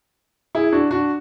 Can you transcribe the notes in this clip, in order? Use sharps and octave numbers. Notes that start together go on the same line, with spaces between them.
E4 G#4
D4 F#4
D4 F#4